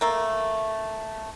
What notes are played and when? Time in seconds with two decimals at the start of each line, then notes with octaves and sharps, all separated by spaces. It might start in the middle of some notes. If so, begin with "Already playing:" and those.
0.01 A3 A#3